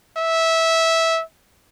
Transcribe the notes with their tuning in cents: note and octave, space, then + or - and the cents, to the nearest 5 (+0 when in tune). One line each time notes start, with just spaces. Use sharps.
E5 -15